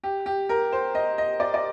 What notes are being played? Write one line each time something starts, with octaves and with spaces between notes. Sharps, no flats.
G4
G4
A#4
C5
D#5
D#5
D5
D5